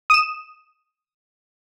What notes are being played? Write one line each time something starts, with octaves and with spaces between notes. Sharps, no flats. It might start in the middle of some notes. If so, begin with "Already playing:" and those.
D#6 E7